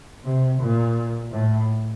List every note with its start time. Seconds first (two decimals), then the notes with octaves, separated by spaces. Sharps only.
0.24 C3
0.60 A#2
1.32 A2